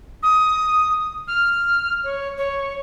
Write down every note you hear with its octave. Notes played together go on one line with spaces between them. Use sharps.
D#6
F6
C#5
C#5